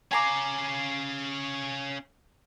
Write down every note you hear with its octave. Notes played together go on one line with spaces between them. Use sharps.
C#4 F5 G#5 A#5 D6